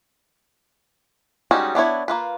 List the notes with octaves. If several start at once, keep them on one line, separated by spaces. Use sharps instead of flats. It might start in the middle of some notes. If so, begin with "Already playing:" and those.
G3 G#3 C#4 D#4 F#4
B3 D4 E4 C#5
A#3 F4 B4